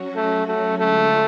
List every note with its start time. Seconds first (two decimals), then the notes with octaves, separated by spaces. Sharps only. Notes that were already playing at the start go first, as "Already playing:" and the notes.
Already playing: F#3 C#4 F#4
0.16 A3
0.47 A3
0.78 D3 G#3 A3 C#4 F4 A4